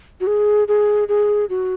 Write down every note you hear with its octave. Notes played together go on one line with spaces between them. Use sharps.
F#4
G#4
G#4
G#4
F#4